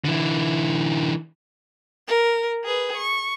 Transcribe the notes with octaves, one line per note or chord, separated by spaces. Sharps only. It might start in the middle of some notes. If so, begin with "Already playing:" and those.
D3 E3
A#4
G#4 B4
C#6